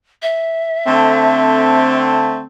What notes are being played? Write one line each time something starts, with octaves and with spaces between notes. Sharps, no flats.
E5
D3 A3 C4